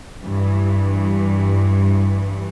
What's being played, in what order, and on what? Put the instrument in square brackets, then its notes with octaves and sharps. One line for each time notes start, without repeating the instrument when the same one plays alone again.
[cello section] G2 E3